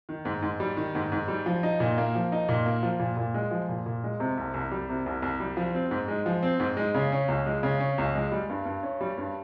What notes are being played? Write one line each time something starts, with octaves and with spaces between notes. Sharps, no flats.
D#3
G#2
G#2
G3
D#3
G#2
G#2
G3
F3
D#4
A#2
A#3
F3
D#4
A#2
A#3
F3
A#2
A#2
G#3
F3
A#2
A#2
G#3
C3
C2
C2
G3
C3
C2
C2
G3
F3
C4
G#2
G#3
F3
C4
G#2
G#3
C#3
C#4
C#2
G#3
C#3
C#4
C#2
G#3
G3
G2
G2
C#4
G3
G2